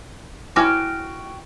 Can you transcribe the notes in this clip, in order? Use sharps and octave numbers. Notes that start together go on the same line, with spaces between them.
E4 F#4 G5 G#5 D6 F6